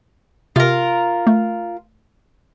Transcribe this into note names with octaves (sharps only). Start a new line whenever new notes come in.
C3 F4 A#4
A3